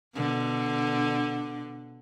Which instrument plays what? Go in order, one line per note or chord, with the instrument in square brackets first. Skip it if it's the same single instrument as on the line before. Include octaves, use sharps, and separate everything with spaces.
[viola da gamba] B2 D3